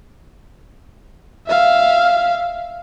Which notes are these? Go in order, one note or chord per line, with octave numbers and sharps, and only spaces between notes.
E5 F5